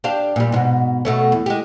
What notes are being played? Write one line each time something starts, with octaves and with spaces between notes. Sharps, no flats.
D4 G4 F5
A#2 G3
G#2 B2
B2 A3 C#4
E2
G#3 G4